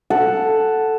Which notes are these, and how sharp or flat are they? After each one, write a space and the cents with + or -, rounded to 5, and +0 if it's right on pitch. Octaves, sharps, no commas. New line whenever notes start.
A4 +0 F#5 +5